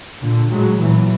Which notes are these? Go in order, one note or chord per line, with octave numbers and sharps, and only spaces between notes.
A#2 D3
A2 F#3 G#3
A#2 E3 F#3